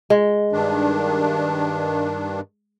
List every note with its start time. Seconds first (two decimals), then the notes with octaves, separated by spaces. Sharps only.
0.10 G#3
0.52 G2 D#3 D4